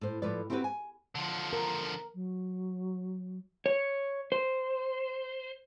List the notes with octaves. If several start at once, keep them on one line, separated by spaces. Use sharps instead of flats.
A2 C5
A2 F3 A3 B4 D5
C4 E4 F#4 G4 A4 B4
G#5
D3 F3
A#4
F#3
C#5
C5